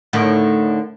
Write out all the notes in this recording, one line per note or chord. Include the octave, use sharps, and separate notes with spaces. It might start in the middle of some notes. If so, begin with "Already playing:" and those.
A2 D3 D#3